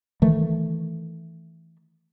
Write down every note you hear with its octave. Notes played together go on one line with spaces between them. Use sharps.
D#3 E3 A3